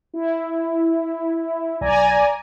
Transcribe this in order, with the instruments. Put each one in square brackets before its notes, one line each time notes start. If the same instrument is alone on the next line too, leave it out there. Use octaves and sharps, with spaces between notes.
[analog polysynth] E4
[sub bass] B1 [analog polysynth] D5 G#5 A#5